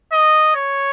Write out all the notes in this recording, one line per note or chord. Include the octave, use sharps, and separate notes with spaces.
D#5
C#5